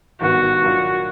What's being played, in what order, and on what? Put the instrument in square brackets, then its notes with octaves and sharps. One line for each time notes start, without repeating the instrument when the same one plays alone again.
[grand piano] G#1 G2 D#3 G3 B3 [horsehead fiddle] F#4
[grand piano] A#2 F#3 A#3 D4 F4